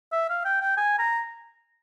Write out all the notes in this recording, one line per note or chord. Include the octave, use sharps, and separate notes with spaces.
E5
F5
G5
G5
G#5
A#5